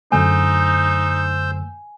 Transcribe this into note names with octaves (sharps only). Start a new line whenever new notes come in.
F#2 D3 A3 D#4 C5 G#5 E6 G6